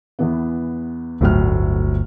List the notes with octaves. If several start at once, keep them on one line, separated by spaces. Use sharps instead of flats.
E2 E3 B3
G1 D2 A2 F#3 F6